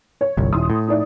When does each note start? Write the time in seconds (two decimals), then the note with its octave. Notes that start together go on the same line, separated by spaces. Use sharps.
0.21 C#5
0.37 G1 C2
0.53 D#1 E4 C6 D#6
0.70 A2
0.88 D#4 E4 D5